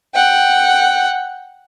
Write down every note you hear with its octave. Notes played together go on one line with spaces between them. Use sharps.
F#5 G5